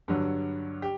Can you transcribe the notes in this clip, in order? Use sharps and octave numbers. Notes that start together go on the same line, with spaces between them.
G2 D3 F#3
G4